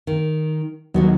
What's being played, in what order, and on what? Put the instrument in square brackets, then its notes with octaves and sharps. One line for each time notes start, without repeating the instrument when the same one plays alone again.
[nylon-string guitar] D#3
[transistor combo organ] D#2 F#3 [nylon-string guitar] B2 B3 F#4